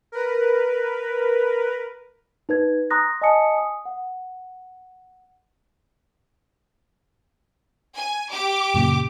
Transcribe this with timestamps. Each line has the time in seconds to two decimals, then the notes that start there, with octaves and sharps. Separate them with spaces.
0.12 A#4 B4
2.49 D#4 B4 G#6
2.90 A#5 C6 D#6 F#6 A#6
3.22 D#5 G#5 A5 D#6 C#7
3.54 G#5 D#6
3.85 F#5
7.96 G#5
8.31 G4 D6
8.74 F#2 A#2 C#3